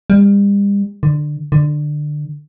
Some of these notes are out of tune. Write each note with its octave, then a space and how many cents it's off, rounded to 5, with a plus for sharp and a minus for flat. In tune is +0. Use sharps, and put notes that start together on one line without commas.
G3 +40
D3 +20
D3 +20